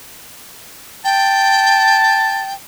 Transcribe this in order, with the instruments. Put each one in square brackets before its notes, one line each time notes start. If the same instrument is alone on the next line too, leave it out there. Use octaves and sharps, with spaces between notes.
[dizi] G5 [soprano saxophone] A5